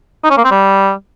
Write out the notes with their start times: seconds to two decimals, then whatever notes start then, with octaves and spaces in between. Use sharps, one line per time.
0.24 D#4
0.31 C#4
0.38 A#3
0.44 C4
0.51 G3